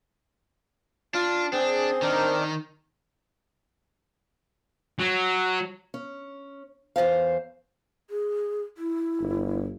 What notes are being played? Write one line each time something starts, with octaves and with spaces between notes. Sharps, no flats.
D4 F4
C4 D4 G#4
D#3 D4 D#4 A#4
F#3
C#4
E2 G2 C5 F5
G#4
E4
G1